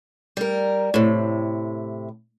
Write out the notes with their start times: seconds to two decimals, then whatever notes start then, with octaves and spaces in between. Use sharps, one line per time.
0.37 G3 A#4
0.94 A2 C3